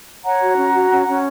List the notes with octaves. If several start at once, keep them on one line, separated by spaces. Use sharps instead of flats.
C#5 F#5 A#5
F#4
C#4
F#4
C#4
C#4